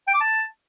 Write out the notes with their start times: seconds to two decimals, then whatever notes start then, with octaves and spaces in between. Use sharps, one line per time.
0.08 G5
0.14 D6
0.21 A5